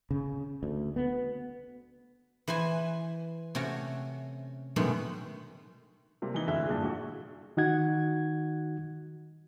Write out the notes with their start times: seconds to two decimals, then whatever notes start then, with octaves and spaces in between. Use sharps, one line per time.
0.11 C#3
0.63 D2
0.96 B3
2.48 E3 B4 C5 G#5
3.55 C3 A3 C#4 F#4
4.76 F#2 B2 D#3 G#3 A3 D4
6.22 C3 G3 A#3
6.34 E3 D#4 G7
6.47 D2 G#2 G#3 E4 E5 F#6
6.67 G2 A#2 G#4
6.83 A#1 F#4
7.57 D#3 D#4 F#4 F#5 G#6